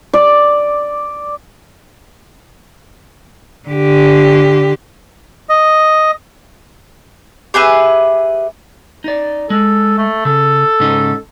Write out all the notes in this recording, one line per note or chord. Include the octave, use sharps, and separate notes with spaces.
D5
D3 G4
D#5
G4 G#4 B4 E5
D#4 D5
G#3 A4
A3
C#3 A4
G#2 C#3 D#4